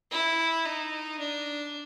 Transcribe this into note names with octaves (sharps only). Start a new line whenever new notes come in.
E4
D#4
D4